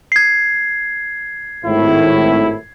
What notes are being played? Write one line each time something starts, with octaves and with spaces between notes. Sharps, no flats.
G#6 C7
G#1 A2 E4